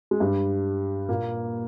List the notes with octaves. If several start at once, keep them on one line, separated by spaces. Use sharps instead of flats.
G#3
G2 G3
A#2 A#3